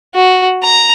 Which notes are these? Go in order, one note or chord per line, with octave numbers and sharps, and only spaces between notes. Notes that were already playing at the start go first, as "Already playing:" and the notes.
F#4
A#5